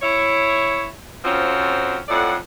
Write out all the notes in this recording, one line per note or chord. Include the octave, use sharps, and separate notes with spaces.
E4 C#5
F2 F3 C4 C#4 F#4
F2 A2 D5 F#5